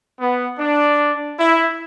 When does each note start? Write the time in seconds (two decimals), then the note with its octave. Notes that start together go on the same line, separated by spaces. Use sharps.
0.19 B3
0.59 D4
1.38 E4